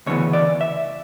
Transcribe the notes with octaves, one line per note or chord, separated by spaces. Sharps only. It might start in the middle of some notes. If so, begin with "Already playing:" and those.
D2 C#3 E3 B3 C#5
D5
E5